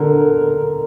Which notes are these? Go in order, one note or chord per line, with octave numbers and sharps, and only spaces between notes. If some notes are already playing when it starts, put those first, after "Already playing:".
Already playing: D3 A#4